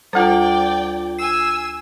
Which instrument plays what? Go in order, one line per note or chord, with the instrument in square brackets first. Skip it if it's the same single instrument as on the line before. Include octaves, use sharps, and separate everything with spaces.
[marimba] D2 A4 [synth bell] G3 F4 [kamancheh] D5 G5
[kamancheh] G#5 E6 [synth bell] C7